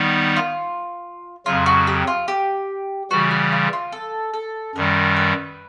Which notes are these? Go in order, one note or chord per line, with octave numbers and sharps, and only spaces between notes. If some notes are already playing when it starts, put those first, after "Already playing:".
Already playing: D#3 G3 B3 D#4
F4
F2 C#3 F#3 F4
F#4
G4
F4
G4
C#3 E3 G3 F#4
F#4
F4
F4
A4
A4
F#2 D#3 G3 A#4
B4